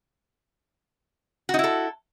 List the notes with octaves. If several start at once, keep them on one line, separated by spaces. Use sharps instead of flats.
D#4 E4 F#4 A4